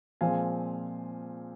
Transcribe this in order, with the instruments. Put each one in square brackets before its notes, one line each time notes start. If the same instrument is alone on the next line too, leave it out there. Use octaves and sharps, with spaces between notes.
[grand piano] A#2 F3 G#3 C4 F5 G#5